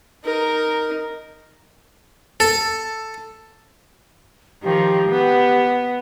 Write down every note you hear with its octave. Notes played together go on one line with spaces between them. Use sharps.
D#4 A#4
A4
D#3 F3 G4
B3